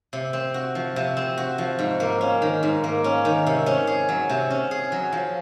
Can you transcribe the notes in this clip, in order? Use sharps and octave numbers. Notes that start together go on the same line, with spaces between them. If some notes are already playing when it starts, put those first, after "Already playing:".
C3
C4
F#4
F3
C3
C4
F#4
F3
G#2
A#3
C#4
D#3
G#2
A#3
C#4
D#3
C3
C#4
G#4
F#3
C3
C#4
G#4
F#3
F3